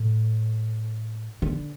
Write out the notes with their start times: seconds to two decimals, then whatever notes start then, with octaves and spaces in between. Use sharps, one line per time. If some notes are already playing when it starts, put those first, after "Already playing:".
Already playing: A2
1.42 D3